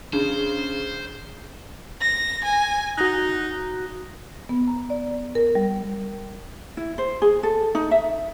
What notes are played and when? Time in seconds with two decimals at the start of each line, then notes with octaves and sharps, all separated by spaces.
0.13 C#3 D4 C5
2.01 A#6
2.44 G#5
2.97 D#4 F#4 F#6
4.49 B3
4.68 A#5
4.90 D5
5.35 A#4
5.55 G3
6.77 E4
6.98 C5
7.22 G#4
7.43 A4
7.75 D#4
7.91 E5